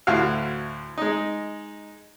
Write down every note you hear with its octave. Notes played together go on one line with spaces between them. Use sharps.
D2 A2 F#4 F5
G#3 D#4